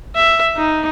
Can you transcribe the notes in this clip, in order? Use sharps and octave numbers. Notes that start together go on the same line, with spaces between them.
E5
D#4